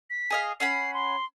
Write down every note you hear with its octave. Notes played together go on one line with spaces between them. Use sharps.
B6
G#4 D#5 F5
C#4 F#5 B5 C7
C6